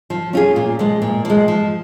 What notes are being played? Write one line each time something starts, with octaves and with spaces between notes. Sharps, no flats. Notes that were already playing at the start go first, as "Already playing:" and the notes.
F3
C#4 F4 G#4
A#2
F3 G#3
A#2
F3 G#3
F3